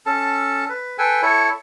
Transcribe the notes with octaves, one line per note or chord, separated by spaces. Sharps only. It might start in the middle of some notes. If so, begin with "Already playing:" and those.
C#4 A4 A5
B4
A4 B4 G5 G#5
E4 A4 C#5